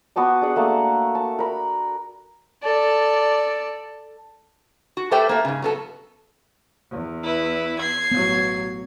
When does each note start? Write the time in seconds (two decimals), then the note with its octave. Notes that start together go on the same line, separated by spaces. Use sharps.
0.16 B3 F#4 A5 D6
0.42 D4 G#4 F#5
0.56 A3 A#3 A5
1.15 A5
1.39 A#4 B5
2.63 A4 D5
4.97 F#4
5.11 A3 G4 A4 B4 C5 G5
5.29 A3 A#3
5.45 G#2 C#3
5.62 F#3 B3 A4
6.90 E2
7.24 E4 B4
7.79 G#6 C7
8.12 A1 F#3 B3